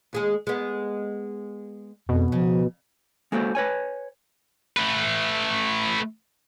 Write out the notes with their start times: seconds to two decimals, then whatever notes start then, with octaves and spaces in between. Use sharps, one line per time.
0.13 D#2 G#3 G#4
0.47 G#3 B3
2.09 F2 B2
2.32 C#3 F3
3.32 G#3 A#3 F#4 A4 C5
3.55 B4 C#5 G#5
4.76 A3 B4